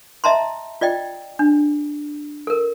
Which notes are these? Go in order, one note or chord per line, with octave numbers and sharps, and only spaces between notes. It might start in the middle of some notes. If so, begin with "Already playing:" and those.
D#5 E5 A5 A#5 C6
F4 D5 D#5 G5
D4
A4 A#4